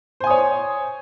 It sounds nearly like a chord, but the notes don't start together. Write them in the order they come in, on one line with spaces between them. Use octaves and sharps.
C5 G#5 D#6 C#5